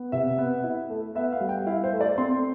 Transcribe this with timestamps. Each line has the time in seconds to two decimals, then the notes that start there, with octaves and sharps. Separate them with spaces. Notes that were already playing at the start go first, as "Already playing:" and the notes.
Already playing: B3
0.12 C3 E5
0.38 B3
0.64 E4
0.90 A3
1.15 B3 E5
1.32 F5
1.41 G3
1.49 G5
1.67 E4 F5
1.84 C5
1.92 A3
2.01 D5
2.18 C4 C6